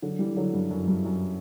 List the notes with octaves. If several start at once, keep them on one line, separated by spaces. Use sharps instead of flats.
D3 F#3
E3 G3
D3 F#3
G2
F#2
G2
F#2